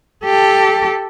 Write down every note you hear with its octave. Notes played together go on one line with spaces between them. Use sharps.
G4 A4